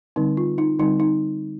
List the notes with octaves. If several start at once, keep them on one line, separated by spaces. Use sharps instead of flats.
D3 G3 C4 D#4
F4
D#4
D3 G3 C4 D#4
D#4